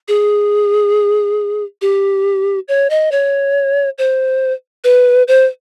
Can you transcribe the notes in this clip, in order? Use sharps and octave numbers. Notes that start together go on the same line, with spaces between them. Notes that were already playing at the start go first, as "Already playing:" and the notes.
G#4
G4
C#5
D#5
C#5
C5
B4
C5